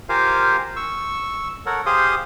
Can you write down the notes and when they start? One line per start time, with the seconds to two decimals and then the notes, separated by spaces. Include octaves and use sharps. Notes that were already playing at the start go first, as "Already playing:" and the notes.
0.09 F4 G4 A#4 C5 F5 G#5
0.76 C#6 E6
1.66 A4 A#4 C#5 F#5
1.86 G4 G#4 C5 F5 C6 D#6